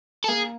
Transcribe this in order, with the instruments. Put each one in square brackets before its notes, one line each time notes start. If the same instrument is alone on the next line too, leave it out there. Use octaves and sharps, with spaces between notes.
[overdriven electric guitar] A4
[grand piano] A#3 [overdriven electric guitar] G#4